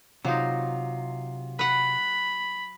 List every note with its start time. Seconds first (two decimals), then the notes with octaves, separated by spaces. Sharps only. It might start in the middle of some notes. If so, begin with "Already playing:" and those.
0.25 C3 F#3 D#4 F4
1.59 B4 F#5 B5